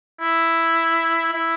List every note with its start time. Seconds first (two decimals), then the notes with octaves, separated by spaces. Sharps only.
0.21 E4
1.33 E4